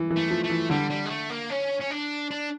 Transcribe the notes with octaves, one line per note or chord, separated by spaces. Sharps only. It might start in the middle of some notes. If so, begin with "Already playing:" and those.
Already playing: E3
E3
A3
F3
A3
E3
D3 G3
G3
G#3
A3
A#3
C#4
C#4
D4
D4